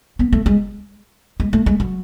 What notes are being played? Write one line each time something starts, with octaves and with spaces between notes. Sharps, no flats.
B3
A3
G#3
G#3
A3
G#3
F#3